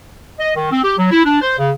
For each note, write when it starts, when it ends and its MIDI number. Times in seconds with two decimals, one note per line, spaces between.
0.39 0.51 75
0.56 0.70 51
0.72 0.83 60
0.83 0.94 67
0.98 1.10 54
1.11 1.21 64
1.25 1.41 62
1.41 1.55 72
1.58 1.71 49